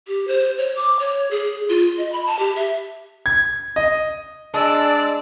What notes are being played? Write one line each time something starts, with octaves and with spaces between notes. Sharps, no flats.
G4
C5
C#5
D6
C#5
G#4
F4
D#5
B5
A5
G4
E5
G#6
D#5
G#3 D4 D5 E6